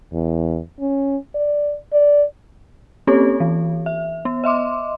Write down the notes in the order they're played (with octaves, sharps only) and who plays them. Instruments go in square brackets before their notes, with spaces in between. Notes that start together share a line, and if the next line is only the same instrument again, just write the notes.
[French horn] E2
C#4
D5
D5
[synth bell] A#3 C4 C#4 G4 A4 C#5
E3
E5
B3
D#5 E5 C6 D6